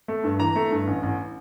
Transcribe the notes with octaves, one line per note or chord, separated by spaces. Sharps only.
A3
G2
E3 A#5
A3
G2
A1
A1